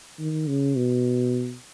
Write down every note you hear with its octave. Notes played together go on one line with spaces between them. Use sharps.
D#3
C#3
B2